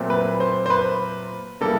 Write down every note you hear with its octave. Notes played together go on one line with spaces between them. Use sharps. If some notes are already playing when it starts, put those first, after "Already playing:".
Already playing: A#2 F#3 A3 C4
B4
C5
C5
B4
C#3 E3 G3 A#3 A4